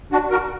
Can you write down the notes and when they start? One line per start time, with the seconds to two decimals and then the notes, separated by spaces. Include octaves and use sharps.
0.12 D4 F#4
0.31 F#4 A#4